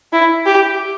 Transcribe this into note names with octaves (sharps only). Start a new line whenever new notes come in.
E4
G4